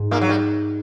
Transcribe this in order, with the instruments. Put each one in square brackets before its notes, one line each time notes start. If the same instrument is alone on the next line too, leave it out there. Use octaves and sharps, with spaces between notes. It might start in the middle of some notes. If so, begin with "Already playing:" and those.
Already playing: [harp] G#2
[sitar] A#2 A#3
F#3
G3